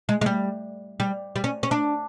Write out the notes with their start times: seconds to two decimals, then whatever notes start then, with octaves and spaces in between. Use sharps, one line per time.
0.09 G#3
0.21 G#3
0.26 G3
1.00 G3
1.36 G3
1.44 C#4
1.63 C#4
1.71 D4